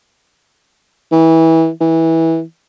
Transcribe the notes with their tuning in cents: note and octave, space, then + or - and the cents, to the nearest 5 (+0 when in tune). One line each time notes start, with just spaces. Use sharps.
E3 -25
E3 -20